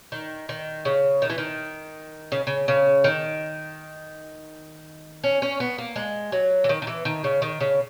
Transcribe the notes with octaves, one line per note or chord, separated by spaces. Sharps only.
D#3
D#3
C#3
D#3
E3
D#3
C#3
C#3
C#3
D#3
C#4
C#4
B3
A#3
G#3
F#3
E3
D#3
D#3
E3
D#3
C#3
D#3
C#3